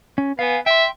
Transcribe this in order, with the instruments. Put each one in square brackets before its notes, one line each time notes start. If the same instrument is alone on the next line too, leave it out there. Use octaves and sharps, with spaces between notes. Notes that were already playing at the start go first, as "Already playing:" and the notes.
[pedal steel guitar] C#4
[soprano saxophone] B3 [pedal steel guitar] F5 G#5
[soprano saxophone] E5 [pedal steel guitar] G5 C6